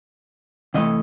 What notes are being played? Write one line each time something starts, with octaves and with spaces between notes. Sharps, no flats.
C3 E3 A3 D#5